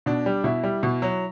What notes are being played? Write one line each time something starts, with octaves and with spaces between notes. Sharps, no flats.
B2 D4
G3
B2 E4
G3
B2
F#3